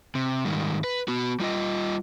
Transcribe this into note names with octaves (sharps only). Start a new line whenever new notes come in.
C3
G#2 D#3 G3
B4
B3 F#4
G3 F4 D#5